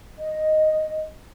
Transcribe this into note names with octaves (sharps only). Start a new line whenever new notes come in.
D#5